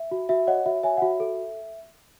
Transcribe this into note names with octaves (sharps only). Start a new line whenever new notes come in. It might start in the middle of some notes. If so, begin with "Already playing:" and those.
Already playing: E5
F#4
F#4 E5
C#5 D#5 F#5
F#4 E5
C#5 E5 G#5
F#5
F#4 E5
A4